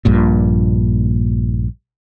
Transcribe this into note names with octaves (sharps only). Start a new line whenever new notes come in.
A#1 G2 A#2